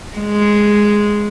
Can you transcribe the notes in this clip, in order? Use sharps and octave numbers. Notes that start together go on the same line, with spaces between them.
G#3